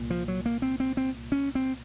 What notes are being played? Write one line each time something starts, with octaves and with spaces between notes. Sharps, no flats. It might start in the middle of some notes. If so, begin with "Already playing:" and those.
Already playing: C2 A#2
F3
F#3
A#3
C4
C4
C4
C#4
C4